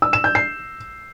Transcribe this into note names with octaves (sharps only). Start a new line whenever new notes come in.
E6
E7
G6
C7